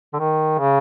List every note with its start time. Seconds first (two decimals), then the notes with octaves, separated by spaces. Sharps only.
0.14 D3
0.19 D#3
0.59 C#3